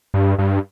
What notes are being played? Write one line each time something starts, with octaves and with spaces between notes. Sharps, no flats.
G2
G2